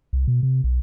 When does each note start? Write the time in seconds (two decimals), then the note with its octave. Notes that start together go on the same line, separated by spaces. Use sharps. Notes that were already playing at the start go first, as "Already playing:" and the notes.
0.13 C2
0.28 B2
0.43 C3
0.64 B1